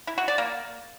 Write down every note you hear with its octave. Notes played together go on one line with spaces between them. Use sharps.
E4
F#4
D5
A#3